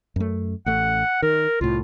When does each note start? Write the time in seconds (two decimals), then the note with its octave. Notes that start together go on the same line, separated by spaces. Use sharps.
0.16 F#2 A3
0.66 A1 A3 F#5
1.22 D#3 A#4
1.61 C2 A2 F4